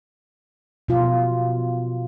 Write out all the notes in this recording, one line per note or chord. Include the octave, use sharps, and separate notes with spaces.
B2 F4